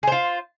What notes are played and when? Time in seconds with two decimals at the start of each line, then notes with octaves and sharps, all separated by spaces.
0.03 G#4
0.07 C5
0.12 F4